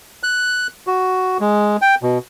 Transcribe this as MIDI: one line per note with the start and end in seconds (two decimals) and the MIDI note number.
0.23 0.67 90
0.87 1.38 66
1.41 1.77 56
1.82 1.95 79
2.03 2.18 47